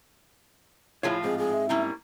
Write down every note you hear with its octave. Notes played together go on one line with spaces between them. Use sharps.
A2 F3 E4 F4 G#4 C#5
G#2 C4 G#4
G#4
E5
G3 A#3 C#4 E4